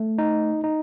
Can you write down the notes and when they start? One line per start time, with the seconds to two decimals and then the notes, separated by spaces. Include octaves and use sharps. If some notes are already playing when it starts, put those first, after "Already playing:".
Already playing: A3
0.18 D#4
0.64 D#4